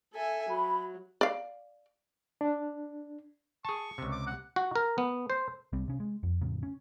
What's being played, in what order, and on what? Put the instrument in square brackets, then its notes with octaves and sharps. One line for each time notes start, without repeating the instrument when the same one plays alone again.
[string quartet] A4 E5 G#5
[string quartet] F#3 [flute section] B5
[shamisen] D5 F5
[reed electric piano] D4
[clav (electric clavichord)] G#4 A5 [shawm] C#6
[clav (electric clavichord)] C#2 C3
[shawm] D6
F#5
[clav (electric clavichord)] F#4
A#4
B3
C5
[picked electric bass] C2 G3 C4
C3 C#4
G#3
F2
F2 A2 C#3
C#4